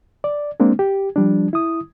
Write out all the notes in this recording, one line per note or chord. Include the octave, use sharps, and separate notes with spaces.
D5
G#3 A#3 C4 D4
G4
F3 G3 D4
E4 D#6